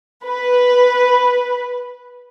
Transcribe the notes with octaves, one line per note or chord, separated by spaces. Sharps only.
B4